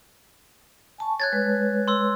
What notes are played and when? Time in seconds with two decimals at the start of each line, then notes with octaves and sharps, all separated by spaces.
0.98 G#5 A5 C#6
1.20 C#5 F#6 G#6 A6
1.33 G#3 B4 C#5
1.88 C6 E6